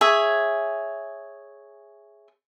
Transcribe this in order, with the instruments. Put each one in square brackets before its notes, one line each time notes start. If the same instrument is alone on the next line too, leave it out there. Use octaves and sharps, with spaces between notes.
[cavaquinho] G#4 C#5 E5